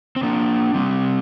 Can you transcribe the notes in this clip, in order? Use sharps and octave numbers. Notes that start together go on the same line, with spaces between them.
C4
A#3 D4
G3 C4